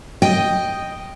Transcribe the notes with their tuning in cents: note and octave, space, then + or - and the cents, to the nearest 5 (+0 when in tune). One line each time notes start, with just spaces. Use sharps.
D#5 +0 G5 +0